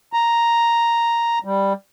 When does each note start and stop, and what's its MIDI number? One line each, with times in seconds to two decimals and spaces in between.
0.13 1.39 82
1.45 1.73 55